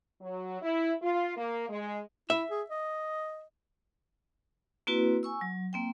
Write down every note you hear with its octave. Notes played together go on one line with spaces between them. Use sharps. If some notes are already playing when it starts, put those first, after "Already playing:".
F#3
E4
F4
A#3
G#3
E4 E5
G#4
D#5
A#3 C4 E4 F#4 B4
G#5 C#6 E6
F#3
A#3 C4 G5